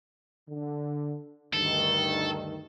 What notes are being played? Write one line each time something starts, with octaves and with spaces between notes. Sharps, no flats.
D3
D2 G2 D#3 A4